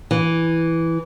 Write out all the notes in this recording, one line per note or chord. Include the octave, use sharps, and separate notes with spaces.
E3